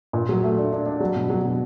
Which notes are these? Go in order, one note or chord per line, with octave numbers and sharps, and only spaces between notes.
A#2
F#3
A3
D4
D4
D4
F#3
B2
F#3
B2